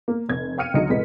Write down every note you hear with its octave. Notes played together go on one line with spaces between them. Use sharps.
A#3
F1 G#6
F5 G5 F6 C#7 D#7
D2 F#3 D#4 D#5 F6 C#7
F1 A2 G#3 B4 D#5 B6